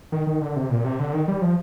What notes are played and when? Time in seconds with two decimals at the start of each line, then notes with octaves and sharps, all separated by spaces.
0.12 D#3
0.27 D#3
0.41 D3
0.56 C3
0.70 A#2
0.84 C3
0.99 D3
1.13 D#3
1.28 G3
1.42 F3